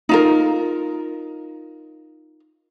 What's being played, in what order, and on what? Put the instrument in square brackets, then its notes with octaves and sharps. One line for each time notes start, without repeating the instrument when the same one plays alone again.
[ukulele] D#4 F4 A#4